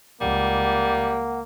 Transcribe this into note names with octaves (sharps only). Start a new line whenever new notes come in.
C#2 G3 A#3 F#5